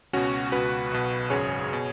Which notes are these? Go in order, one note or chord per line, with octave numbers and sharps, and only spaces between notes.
C#2 B2 C#4 F#4
C#2 B2 F#4 B4
B1 B2
G#1 F#2 C#3 G#4 C#5
B2